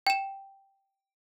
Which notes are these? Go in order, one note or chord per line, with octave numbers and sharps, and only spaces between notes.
G5 E7